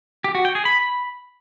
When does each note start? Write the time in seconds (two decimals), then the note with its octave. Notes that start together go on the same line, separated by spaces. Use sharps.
0.24 G4
0.35 F#4
0.45 G5
0.55 G#4
0.65 B5